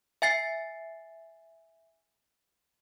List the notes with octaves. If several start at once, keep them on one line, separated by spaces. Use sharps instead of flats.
E5 G#5 A6 C7